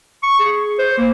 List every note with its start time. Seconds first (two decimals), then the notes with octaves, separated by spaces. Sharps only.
0.23 C#6
0.40 G#4
0.79 C5
0.98 A#3